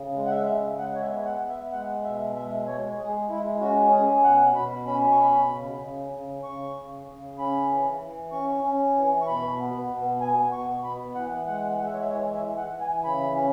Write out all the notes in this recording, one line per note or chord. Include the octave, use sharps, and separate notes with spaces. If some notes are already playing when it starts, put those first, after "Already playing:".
Already playing: C#3
G#3
F#5
E5
C#3
G#3 F#5
C#5
E5
B3
F#5
B3
E5
G#3 F#5
B2 E5
G#3 E5
G#3 C#5
G#3 G#4
G#3 E4
C#4 F#4
C#4 G#4
B2 F#5
B2 B5
C#4 B5
C#6
B2 B5
C#3
C#3
C#3
C#3 C#6
C#3
C#3
C#4 B5
E3
E3
C#4 C#6
C#4
E3
C#6
B2 B5
B3
B2
B3 G#5
B2 C#6
B3 B5
E3 F#5
G#3 F#5
G#3 F#5
E5
C#5
E5
E3 C#5
E5
E3
F#5
E3
G#5
C#3 B5
C#4